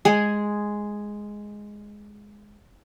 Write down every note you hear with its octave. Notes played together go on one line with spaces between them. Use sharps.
G#3 G#4